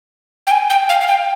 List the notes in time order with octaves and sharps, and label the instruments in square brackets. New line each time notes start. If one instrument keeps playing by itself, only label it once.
[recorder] G5
G#5
G5
F5
F5
G5